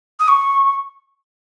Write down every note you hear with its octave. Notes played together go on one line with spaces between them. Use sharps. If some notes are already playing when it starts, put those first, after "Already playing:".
D#6
C#6